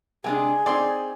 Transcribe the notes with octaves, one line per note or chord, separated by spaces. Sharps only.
C3 G#3 D4 G#4 G#5
C4 D#4 D5 C6